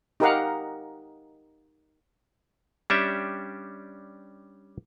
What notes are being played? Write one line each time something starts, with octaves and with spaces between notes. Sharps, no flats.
D#4 G4 A#4 D#5 F5 F#5
G3 C#4 D4 G4 E5